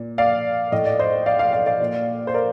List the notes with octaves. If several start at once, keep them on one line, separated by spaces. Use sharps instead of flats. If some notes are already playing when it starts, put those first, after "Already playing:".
Already playing: A#2
D5 F5
A2 D#5
D5
C5 D#5
D5 F5
D5 F5
D5 F5
D5 F5
A#2
C5
A#4 D5